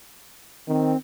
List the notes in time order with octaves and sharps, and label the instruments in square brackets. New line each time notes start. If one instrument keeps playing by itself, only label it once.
[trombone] D#3 [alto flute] C4